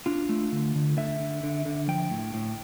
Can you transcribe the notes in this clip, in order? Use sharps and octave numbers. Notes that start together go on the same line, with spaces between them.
D4 F4
A3
D3
D3
D3 E5
D3
D3
D3
F3 G5
A2
A2